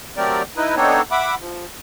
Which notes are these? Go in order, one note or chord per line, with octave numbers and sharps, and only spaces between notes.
F#3 A3 C4 G4 A#4 D5
D#4 E4 B4 D#5
B3 C4 D4 D#4 A4 C#5
E5 F#5 B5 D6
F3